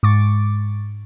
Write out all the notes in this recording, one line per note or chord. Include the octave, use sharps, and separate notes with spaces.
G#2 C#6 D6 A6